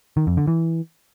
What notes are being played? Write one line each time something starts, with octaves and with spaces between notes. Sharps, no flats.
D#3
F2
D3
E3